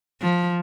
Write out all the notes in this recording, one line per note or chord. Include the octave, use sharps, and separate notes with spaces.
F3